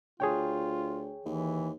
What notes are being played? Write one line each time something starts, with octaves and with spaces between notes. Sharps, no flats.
D2 F4 G#4 C#5 G5
D#2 E3